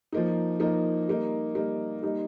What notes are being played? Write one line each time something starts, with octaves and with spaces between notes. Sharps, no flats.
F3 A#3 D#4
F3 A#3 D#4
G3 A#3 D#4
G3 A#3 D#4
G3 A#3 D#4